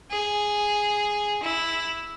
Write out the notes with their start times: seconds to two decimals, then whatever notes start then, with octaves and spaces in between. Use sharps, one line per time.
0.11 G#4
1.43 E4